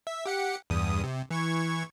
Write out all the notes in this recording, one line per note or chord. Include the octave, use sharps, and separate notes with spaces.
E5
G4 F#5 C#7
E2 G2 D#6
C3
E3 C#6 G#6